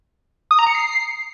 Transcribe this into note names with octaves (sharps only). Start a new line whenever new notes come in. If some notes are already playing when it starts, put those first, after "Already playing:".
D#6
A#5
C#7
C7